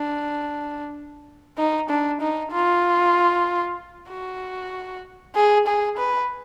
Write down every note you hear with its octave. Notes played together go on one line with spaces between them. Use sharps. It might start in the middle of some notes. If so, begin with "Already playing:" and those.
Already playing: D4
D#4
D4
D#4
F4
F#4
G#4
G#4
B4